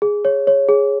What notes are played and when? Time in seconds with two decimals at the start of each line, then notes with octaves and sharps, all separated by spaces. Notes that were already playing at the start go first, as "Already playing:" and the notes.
0.02 G#4
0.25 C#5
0.47 C#5
0.69 G#4